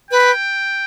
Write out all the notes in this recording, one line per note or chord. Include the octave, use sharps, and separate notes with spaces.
B4 G5